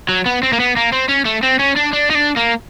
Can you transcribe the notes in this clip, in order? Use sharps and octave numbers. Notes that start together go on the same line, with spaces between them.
F#3
B3
C4
A#3
B3
A#3
C4
C#4
A3
C4
C#4
D4
D4
D#4
D4
A#3